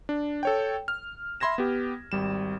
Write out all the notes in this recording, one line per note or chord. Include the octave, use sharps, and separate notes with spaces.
D4
A4 C#5 G5
F6
E5 B5 C6 G#6 A#6 E7
B3 G4
G#1 G3 E7